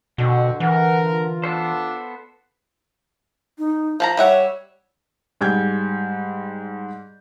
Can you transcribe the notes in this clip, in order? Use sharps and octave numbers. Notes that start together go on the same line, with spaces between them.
B2 D3 C4 D4 F#4
E3 A#4 F#5
F4
B3 D4 A4 C5
D#4
F3 F5 A5 A#5
G3 C#5 E5 F#5
G#2 G3 G6 G#6